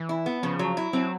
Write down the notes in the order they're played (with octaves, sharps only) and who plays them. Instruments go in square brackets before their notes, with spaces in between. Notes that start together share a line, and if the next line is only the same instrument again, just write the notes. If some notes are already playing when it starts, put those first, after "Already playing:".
Already playing: [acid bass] E3
[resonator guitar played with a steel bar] E4
B3
[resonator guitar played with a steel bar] C#3 [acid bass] F3
[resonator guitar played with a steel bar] F#3
E4
[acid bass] F#3 [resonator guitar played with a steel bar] C4